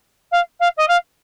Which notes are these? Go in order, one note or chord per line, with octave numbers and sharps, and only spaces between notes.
F5
F5
D#5
F5